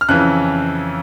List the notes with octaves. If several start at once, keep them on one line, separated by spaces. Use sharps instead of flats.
F6
F2 C#3 E3 F#6